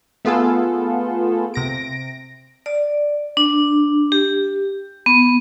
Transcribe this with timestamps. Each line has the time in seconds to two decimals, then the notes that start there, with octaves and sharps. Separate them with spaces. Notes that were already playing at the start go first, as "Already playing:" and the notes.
0.25 A3 B3 F4 G#4 A4
1.54 C3 A#6 D7
2.66 D5
3.37 D4
4.12 G4
5.06 B3